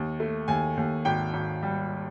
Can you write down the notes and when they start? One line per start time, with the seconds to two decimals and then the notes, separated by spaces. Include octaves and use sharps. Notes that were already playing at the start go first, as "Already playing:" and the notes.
Already playing: D#2
0.20 A3
0.48 D#2 G#5
0.77 D#2
1.05 G#1 G5
1.34 G#1
1.63 G3